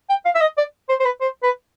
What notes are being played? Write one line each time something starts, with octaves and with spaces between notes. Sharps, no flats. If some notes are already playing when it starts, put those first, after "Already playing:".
G5
F5
E5
D#5
D5
C5
C5
B4
C5
B4